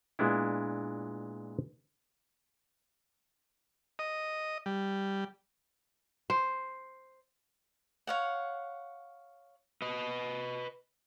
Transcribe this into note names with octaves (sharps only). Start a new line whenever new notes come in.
A#2 G#3 B3 D4 E4
D#5
G3
C5
C#5 F5 F#5
B4 D#5